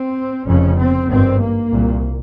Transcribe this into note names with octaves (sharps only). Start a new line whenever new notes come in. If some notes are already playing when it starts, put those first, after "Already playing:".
Already playing: C4
F1 F2 C#3 C#4
C4
G#1 G2 C4
A#3
C2 A#2